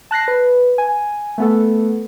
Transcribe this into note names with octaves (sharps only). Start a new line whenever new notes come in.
A5 F#6 A#6 C7
B4
G#5
A3 B3 A4